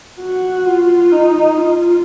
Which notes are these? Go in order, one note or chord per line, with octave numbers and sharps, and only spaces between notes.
F#4
F4
D#4
F4